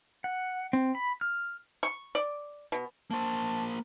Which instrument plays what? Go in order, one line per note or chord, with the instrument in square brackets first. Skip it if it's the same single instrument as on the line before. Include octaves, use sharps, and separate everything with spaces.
[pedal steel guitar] F#5
C4
B5
F6
[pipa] C#6
D5
B2
[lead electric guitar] A#3 C5 [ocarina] A5